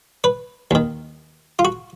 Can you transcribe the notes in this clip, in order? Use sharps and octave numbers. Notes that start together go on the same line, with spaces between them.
B4
D#2 D#3
F4
F#4